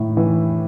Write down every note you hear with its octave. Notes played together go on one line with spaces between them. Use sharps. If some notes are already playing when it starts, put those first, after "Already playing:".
Already playing: A2 D#3
E3